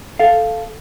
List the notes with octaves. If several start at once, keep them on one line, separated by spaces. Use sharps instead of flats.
A4 F5